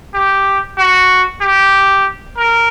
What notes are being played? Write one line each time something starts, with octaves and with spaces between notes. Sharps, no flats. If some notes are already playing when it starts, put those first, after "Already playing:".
G4
F#4
G4
A#4